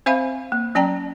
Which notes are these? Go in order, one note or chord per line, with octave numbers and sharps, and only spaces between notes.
C4 C5 E5 F5 G#5 B5
A#3
F#3 C#4 D5 G5 A5 A#5